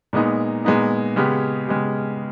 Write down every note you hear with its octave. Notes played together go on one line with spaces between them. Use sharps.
A#2 G#3 B3 D#4
A#2 G#3 B3 D#4
C#3 G#3 B3 G4
C#3 G#3 B3 G4